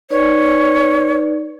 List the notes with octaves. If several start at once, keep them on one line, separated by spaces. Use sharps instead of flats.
D#4 B4 C#5 D5